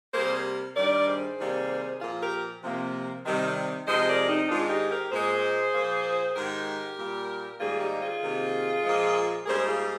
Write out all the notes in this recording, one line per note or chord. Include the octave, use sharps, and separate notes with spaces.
C3 G3 A#3 G#4 C5
G2 D#3 G3 A#4 D5
G#4 C5
C3 D#3 G3 A#3
A#2 F3 A#3 F4 G#4
G4 A#4
C3 F3 A#3
C3 D#3 G3
C3 F3 G#3 C5 D#5
A#4 D5
C4 D#4
G#2 D#3 G#3 D4 F4
D#4 G4
G4 A#4
A#2 G#3 G#4 C5
A#2 F3 A#3
G#2 D#3 G#3 G4 A#4
A#2 G3 A#3
G#2 D#3 G3 A#3 F4 G#4
D#4 G4
F4 G#4
C3 D#3 A#3
A#2 F3 G#3
G#2 G3 A#3 G#4 C5
F4 G#4